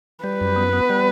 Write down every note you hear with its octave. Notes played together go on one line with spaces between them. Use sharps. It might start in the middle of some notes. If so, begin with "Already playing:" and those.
G3 B4
F#2
B3
B3
G3